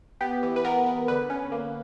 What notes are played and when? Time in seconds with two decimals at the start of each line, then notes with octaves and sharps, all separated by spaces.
0.21 B3 G4
0.43 E3
0.56 B4
0.65 B3 A#4
0.86 B3
1.08 D3 B4
1.30 C#4
1.52 A#3